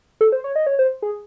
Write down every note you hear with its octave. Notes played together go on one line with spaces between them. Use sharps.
A4
C5
C#5
D#5
C#5
C5
G#4